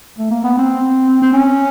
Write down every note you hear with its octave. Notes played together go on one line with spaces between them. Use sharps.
A3
A#3
B3
C4
C4
C#4